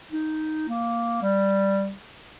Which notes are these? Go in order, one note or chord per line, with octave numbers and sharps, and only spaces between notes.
D#4
A#3
G3